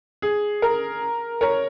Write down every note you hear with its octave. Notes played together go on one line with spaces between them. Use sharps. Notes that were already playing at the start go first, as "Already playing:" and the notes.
G#4
A#4
A#4 C#5